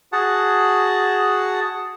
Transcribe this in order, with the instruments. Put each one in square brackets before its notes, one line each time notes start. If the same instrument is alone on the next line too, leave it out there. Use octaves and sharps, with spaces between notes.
[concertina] F#4 G#4 F#5 A5